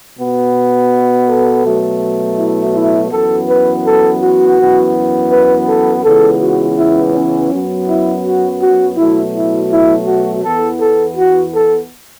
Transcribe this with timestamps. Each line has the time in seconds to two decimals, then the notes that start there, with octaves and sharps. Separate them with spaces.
0.18 B2 B3
1.29 A4
1.65 B2 F#3 A3
2.38 E4
2.75 E4
3.11 F#2 E3 B3 A4
3.48 B4
3.85 A4
4.22 F#4
4.58 F#2 E3 B3
5.31 B4
5.68 A4
6.04 C#2 C#3 E3 B3 A4
6.41 F#4
6.78 E4
7.14 C#4
7.51 F#2 F#3 B3
7.88 E4
8.24 F#4
8.61 F#4
8.97 B2 F#3 A3 E4
9.34 E4
9.71 E4
10.07 F#4
10.44 E2 E3 B3 A4
10.80 A4
11.17 F#4
11.54 A4